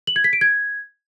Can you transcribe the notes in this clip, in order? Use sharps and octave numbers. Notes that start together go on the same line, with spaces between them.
F#7
G#6
B6
D7
G#6